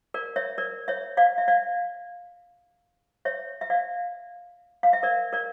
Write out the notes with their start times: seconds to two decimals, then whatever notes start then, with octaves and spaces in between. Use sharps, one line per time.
0.14 A#4 D5
0.36 C#5 E5
0.58 A#4 D5
0.88 C#5 E5
1.17 D5 F5
1.38 E5
1.48 D5 F5
3.25 C#5 E5
3.61 E5
3.70 D5 F5
4.83 F5
4.93 E5
5.03 A#4 D5
5.33 A#4 D5